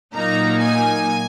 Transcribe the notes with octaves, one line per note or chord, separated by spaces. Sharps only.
A#2 F#3 A#3 D#4 A#5
G#5